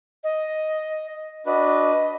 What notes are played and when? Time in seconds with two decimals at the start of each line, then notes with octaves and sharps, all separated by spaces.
0.24 D#5
1.46 D4 F#4 B4 D#5